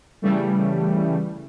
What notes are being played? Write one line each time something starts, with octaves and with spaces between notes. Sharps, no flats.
C#3 E3 G3 A3